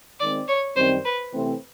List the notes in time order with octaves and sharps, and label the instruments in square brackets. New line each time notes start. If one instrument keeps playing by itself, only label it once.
[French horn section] D#3 G#3 C4 [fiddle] D5
[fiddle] C#5
[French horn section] F#2 D#3 G3 C4 [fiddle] C5
[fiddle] B4
[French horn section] C3 E3 A3 C4